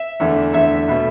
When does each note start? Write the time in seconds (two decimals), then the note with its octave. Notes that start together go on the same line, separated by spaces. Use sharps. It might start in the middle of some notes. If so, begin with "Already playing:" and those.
Already playing: E5
0.20 E2 D3 A3
0.53 E2 D3 A3 E5
0.88 B2 A3